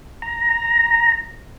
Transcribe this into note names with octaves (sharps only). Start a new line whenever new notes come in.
A#5